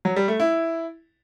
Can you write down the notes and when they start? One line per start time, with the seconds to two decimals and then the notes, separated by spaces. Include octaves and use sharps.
0.05 F#3
0.16 G3
0.28 A3
0.40 E4